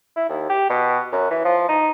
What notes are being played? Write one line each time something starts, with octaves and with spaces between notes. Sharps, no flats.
E4
D#2
G4
B2
F#2
E3
F3
D#4